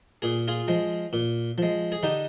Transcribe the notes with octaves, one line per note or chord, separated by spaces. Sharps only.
A#2 G#4
F4 G#4
F3 G#3
A#2
F3 G#3
G#4
D3 D#4 G4